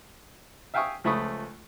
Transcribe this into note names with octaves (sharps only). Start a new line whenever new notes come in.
E5 F5 G5 G#5 C#6 D#6
C#2 F3 A3 B5 C#6 D#6